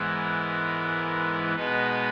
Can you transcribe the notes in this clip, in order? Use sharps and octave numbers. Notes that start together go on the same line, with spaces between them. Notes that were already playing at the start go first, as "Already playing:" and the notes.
Already playing: G#2 E3 G#3 B3 E4 A#4
B2 G#3 B3 D#4 B4